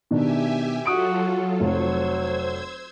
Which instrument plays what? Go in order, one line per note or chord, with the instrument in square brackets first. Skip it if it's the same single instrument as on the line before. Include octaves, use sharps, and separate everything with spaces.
[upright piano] B2 D#3 D4 [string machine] G4 E5 G#5
[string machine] F#3 F4 A4 [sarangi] F#4 [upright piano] D#6 D7
[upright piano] F1 [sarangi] F#3 [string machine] C5 E6 G#6